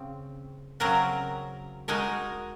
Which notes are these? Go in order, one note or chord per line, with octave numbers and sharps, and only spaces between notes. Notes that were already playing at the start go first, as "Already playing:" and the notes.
Already playing: C#3 C4
C#3 F#3 C4 F#4 A#4
G#3 D#4 F#4 A#4